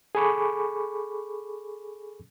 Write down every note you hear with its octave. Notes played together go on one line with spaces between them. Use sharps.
G#4 A4 G#5 B5 C#6 D6